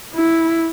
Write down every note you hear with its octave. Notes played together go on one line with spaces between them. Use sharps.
E4